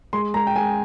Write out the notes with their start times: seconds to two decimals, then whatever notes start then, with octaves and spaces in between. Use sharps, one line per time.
0.13 G#3 C6
0.34 G#3 A#5
0.47 G5
0.56 G#3 G#5